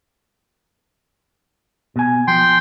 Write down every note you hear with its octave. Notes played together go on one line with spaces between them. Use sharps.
B2 G#5
F3 G5 C6